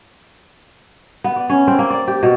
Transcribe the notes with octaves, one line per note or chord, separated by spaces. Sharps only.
B3
D5
C#4
C4
A#3
D5
G4
B2